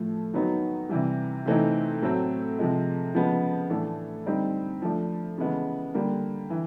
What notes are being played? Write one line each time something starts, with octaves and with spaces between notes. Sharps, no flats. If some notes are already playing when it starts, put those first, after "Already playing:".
Already playing: A2 F3 A3
D#3 F#3 B3 D#4
C3 E3 G3
C3 E3 A3 C4 D#4
A2 F#3 A3 C4
C3 F3 G#3
C#3 F3 G#3 B3
A2 E3 A3 D4
D3 G3 C4 D#4
F3 A3 D4
C#3 E3 G#3 B3
D3 G3 A#3
E3